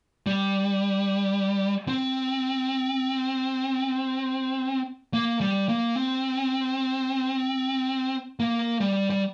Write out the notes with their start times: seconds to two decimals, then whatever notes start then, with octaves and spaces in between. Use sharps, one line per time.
0.27 G3
1.88 C4
5.14 A#3
5.41 G3
5.69 A#3
5.95 C4
8.40 A#3
8.80 G3
9.10 G3